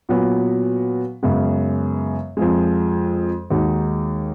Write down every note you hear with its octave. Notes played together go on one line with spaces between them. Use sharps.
A#2 F#3 B3 F#4
F#2 C#3 G#3 B3
F2 F3 G#3
D#2 D#3 G#3 D#4 F#4